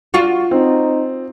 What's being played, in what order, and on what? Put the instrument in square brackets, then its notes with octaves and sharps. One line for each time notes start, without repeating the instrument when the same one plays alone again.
[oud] F4 F#4
[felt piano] C4 [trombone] D#4